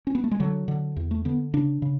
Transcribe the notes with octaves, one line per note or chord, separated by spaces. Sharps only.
C#4
B3
A3
G#3
D3 F#3
D3
E2
A3
D3 B3
C#3 D4
C#3